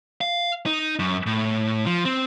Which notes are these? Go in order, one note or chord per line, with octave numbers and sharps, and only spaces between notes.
F5
D#4
F#2
A2
F3
C4